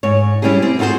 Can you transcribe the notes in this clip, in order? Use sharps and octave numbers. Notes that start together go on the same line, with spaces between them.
G#2 C#5
G3 C#4 E4 G4 G#4
C4
F4 F#4 G#4 A#4 C5